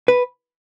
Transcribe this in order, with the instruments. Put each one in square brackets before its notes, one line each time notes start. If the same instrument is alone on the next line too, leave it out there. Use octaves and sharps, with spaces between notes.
[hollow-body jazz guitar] B4